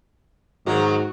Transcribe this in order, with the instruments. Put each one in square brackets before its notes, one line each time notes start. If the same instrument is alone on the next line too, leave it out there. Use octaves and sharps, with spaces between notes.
[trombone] G#2 [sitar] D#3 F#3 A#3 [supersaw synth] F#4